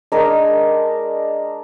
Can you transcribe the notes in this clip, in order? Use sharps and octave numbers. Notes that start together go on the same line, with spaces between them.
G#3 D4 A#4